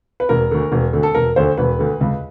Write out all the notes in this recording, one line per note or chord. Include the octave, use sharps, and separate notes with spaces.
B4
E1 A#4
D2 D3
E1
D2 D3
A4
E1 A#4
D2 D3 C5
E1 B4
D2 D3
C#2